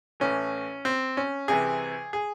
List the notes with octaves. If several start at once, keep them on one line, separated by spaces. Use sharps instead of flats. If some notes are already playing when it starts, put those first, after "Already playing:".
A1 A2 E3 C#4
C4
C#4
C2 C3 E3 G#4
G#4